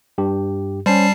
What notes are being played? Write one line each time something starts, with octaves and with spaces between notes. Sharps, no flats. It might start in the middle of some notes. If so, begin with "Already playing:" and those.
G2 G4
G3 C#4 C5 A5 C7